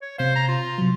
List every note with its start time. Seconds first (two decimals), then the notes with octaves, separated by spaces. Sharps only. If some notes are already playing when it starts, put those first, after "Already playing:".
0.02 C#5
0.18 C3 C5 F5
0.36 A#5
0.48 F4
0.78 C3 F#3